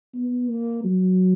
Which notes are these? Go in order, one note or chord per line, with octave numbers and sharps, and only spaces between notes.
B3
A#3
F#3